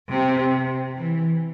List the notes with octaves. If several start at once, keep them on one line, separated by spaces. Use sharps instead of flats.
C3
E3